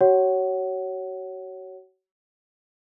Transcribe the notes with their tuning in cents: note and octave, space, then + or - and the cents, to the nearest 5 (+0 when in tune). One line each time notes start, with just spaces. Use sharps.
F#4 +35 C#5 +0 F#5 +20